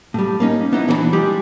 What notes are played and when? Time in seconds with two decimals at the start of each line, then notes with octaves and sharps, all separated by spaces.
0.14 A2 G3
0.40 A#3 C#4 D#4
0.73 B3 D#4 E4
0.88 A#2 E3 D4 C5 D5 B5
1.13 G3 G#3 F4 G4 D5